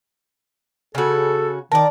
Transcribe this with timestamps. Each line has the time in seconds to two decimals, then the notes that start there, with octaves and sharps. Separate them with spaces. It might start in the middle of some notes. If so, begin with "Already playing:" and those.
0.95 C#3 F#4 A4
1.72 D#3 A#4 D5 A5